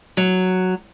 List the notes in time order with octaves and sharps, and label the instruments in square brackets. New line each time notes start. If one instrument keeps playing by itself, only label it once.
[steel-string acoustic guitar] F#3